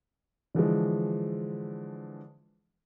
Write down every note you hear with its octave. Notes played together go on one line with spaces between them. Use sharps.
D3 E3 F3 G#3